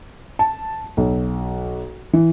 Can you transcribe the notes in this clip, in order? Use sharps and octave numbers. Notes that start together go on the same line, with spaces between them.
A5
B1
E3